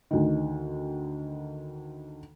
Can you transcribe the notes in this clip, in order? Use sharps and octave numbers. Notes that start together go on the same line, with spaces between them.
D2 D#3